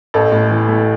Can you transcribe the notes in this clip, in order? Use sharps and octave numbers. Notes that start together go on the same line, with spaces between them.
A1 A4
A2
E3
A3